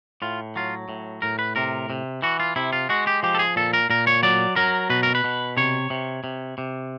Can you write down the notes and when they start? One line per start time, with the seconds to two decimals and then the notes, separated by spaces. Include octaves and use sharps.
0.22 A2 F4
0.56 F#3 F4
0.89 A2
1.22 A2 A#4
1.39 B4
1.56 C3 A#4
1.90 C3
2.22 E3 F#4
2.40 F4
2.56 C3 E4
2.73 F4
2.89 G#3 F#4
3.07 G4
3.23 F3 G4
3.35 A4
3.39 G#4
3.56 A#2 A4
3.73 A#4
3.90 A#2 A#4
4.07 C#5
4.23 F#3 D5
4.56 F#3 A#4
4.90 B2 B4
5.03 A#4
5.15 B4
5.24 B2
5.57 C3 C#5
5.90 C3
6.24 C3
6.58 C3